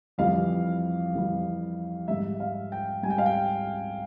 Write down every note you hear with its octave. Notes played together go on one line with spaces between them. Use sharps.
F2 E3 G3 F5
F2 E3 G3
G#2 G3 E5
F5
G5
G#2 G3 G#5
G5
F5
G5